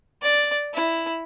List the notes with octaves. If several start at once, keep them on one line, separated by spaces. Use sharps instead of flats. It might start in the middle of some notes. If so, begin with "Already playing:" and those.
D5
E4